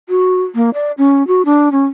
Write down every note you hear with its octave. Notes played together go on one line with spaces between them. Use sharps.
F#4
A#3
D5
C#4
F#4
D4
C#4